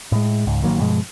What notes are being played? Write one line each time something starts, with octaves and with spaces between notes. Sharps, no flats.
A2 G#3
C#2 G#2
A1 D#3 F#3 A#3
G2 B2 F3 G#3